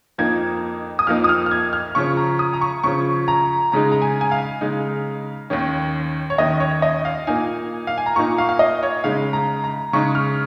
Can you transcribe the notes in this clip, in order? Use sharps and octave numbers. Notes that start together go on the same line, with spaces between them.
F2 F3 A#3 D#4 G#6
D#6
F2 F3 A#3 D#4 F6
D#6
F6
F6
G#6
F6
C#3 F3 C#4 C#6
A#5
D#6
A#5
C#6
C#3 F3 C#4 C#6
A#5
C#3 G#3 D#4 A#5
A#5
G#5
G#5
F5
C#3 G#3 D#4
D#2 D#3 C#4
C#5
D#2 D#3 C#4 D#5
C#5
D#5
F5
A#2 A#3 D#4 G#5
F5
G#5
A#5
A#2 A#3 D#4 C#6
F5
F5
D#5
C#5
C#3 G#3 D#4 F5
A#5
A#5
C#3 G#3 D#4 C#6
F6